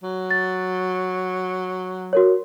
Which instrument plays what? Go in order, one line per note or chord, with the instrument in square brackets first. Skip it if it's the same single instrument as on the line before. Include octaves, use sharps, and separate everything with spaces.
[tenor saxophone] F#3
[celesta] A6
F#4 A#4 C#5